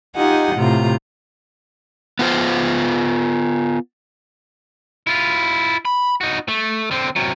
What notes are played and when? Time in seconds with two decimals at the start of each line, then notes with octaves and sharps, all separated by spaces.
0.15 D#4 F4 G4 D#5 F#5 G#5
0.54 A2 C3 F4 A#5
2.19 B3 F4 C5
5.07 E4 F4
5.85 B5
6.21 D#4 F#4
6.48 A3
6.91 D3 C4
7.16 C3 F#3